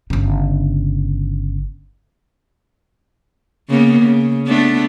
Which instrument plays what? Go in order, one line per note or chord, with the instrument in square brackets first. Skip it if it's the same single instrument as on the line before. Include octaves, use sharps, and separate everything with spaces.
[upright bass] G1 C#3
[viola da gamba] C#3 A#3 B3
C#3
A3 B3 D4